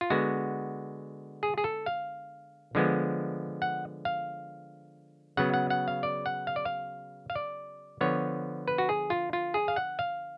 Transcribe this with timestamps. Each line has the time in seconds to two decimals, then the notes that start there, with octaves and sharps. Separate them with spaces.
0.01 F4
0.10 D3 G#3 B3 F#4
1.43 G#4
1.58 G#4
1.64 A4
1.86 F5
2.75 D3 F3 G#3 B3
3.62 F#5
4.05 F5
5.37 C#3 F#3 B3 F#5
5.54 F#5
5.70 F#5
5.88 F5
6.03 D5
6.26 F#5
6.47 F5
6.56 D5
6.65 F5
7.30 F5
7.35 D5
8.01 D3 F3 B3 C#5
8.68 B4
8.78 F#4
8.89 G#4
9.10 F4
9.33 F4
9.54 G#4
9.68 F5
9.76 F#5
9.99 F5